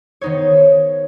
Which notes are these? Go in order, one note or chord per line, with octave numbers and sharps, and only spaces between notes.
D#3 B3 D#4 C5 C#5